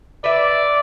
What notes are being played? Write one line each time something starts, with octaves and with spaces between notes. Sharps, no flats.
B4 D5 E5